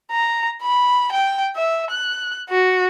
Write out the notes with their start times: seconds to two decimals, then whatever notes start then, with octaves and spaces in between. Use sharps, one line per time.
0.11 A#5
0.62 B5
1.12 G5
1.56 E5
1.91 F#6
2.49 F#4